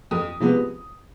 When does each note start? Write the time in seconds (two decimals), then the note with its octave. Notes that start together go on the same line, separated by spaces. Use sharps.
0.11 F2 D#6
0.40 C3 F3 G#3 B3